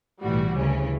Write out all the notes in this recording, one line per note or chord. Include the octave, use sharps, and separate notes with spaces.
B1 A2 E3 G3 F#4
D2 C#3 E3 C#4